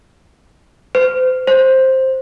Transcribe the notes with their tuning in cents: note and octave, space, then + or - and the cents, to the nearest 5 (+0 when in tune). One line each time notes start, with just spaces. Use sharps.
C5 -40
C5 +10